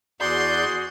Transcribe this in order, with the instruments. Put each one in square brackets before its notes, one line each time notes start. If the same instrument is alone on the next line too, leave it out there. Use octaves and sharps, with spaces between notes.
[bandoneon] E2 D5 G6 [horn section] F#4 G#4 [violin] C6